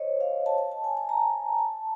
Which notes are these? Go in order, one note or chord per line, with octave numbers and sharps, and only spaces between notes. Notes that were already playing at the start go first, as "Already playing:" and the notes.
Already playing: C5 C#5 D#5
F5
A5
A5
A5
G#5
A5
A#5
A5